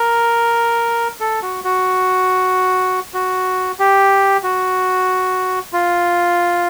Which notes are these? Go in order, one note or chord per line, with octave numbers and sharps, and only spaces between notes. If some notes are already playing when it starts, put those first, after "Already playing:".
Already playing: A#4
A4
F#4
F#4
F#4
G4
F#4
F4